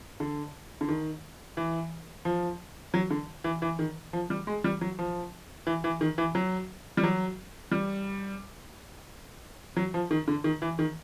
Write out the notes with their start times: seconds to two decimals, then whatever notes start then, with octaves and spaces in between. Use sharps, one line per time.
0.20 D3
0.81 D3
0.88 D#3
1.57 E3
2.25 F3
2.94 F#3
3.10 D3
3.44 E3
3.62 E3
3.79 D#3
4.13 F3
4.30 G3
4.47 G#3
4.64 G3
4.81 F#3
4.99 F3
5.67 E3
5.84 E3
6.01 D#3
6.18 E3
6.35 F#3
6.97 G3
7.04 F#3
7.72 G3
9.77 F#3
9.94 F3
10.11 D#3
10.28 D3
10.44 D#3
10.62 E3
10.79 D#3